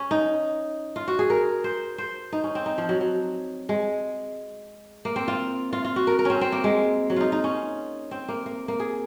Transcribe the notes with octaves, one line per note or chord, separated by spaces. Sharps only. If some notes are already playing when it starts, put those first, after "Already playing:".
Already playing: C#4
D#4
F4
F#4
G#4
A#4
C5
C5
D#4
C#4
C4
D#4
F3
F#3
F#3
G#3
A#3
C4
F4
F4
F4
F#4
A#4
A#4
C4 C#4
C4
A#3
G#3
F#3
D#4 F4
D#4
C#4
C4
A#3
A#3
A#3
G#4